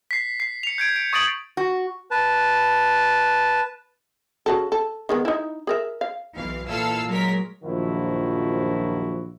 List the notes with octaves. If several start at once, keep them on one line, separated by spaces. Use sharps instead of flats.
B6 C7
C7
C#7 F7
G6 G#6 D7
D7
C#6 D#6 A6 D7 F#7
F#4
B4 A5
C#3 F#4 A4
A4
D#3 G#3 B3
D#4 E4
G#4 A#4 E5
F5
B1 E3 F5
A#2 E3 E4 A4 F5 E6
F#3 G#3 A#4 B6
A#1 F#2 D#3 F3 E4 F#4